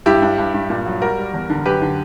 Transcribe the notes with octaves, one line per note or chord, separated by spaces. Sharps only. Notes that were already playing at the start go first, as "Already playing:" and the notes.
G2 E4 G4
G2
G2
G2
A#2
F#3
G3 F#4 A#4
G3
E2
D3
F#2 G4 B4
D3